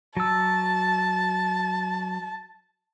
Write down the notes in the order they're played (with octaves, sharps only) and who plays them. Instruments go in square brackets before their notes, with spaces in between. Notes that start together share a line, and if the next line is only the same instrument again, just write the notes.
[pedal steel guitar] F#3 E6 [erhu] A5